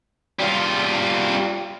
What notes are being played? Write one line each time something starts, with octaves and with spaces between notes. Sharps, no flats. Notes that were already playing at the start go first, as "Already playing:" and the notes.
G3 F4